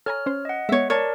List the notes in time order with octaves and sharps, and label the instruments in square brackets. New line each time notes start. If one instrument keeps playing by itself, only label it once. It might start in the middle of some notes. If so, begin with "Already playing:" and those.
[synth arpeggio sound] A4 G#5 A#5 [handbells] C#5 F6
[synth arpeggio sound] C#4 C5
[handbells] D#5 F#5
[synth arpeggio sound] G#3 B3 [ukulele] C#5 E5
[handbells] A#4 D5 A5 [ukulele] C#5